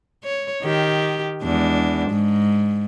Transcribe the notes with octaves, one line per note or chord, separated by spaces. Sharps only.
C#5
D#3 G4
E2 G#3 D4
G#2